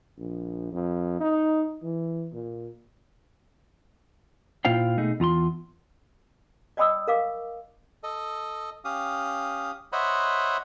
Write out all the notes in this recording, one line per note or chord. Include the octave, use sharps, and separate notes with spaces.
A#1
F2
D#4
E3
A#2
A#2 E4 F4 C5 F5 G5
B2 A3 D#4 G#4
E2 F4 A#5 C6
D5 D#5 G5 B5 D#6 E6
A#4 F5 D6
A4 D#5
C#4 G4 F5 D#6
C5 C#5 D#5 E5 F#5 B5